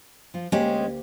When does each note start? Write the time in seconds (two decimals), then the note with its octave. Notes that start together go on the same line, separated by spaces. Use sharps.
0.34 F3 F4
0.52 D2 G#3 A#3 C4 C#4 G4